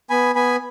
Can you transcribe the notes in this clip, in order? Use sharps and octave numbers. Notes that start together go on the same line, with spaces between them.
B3 G#5 B5
B3 G#5 B5